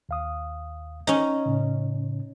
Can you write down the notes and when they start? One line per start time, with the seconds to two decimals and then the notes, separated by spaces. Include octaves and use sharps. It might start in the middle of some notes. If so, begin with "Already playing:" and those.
0.09 D#2 F5 D#6
1.07 C#4 D#4
1.46 A2 C#3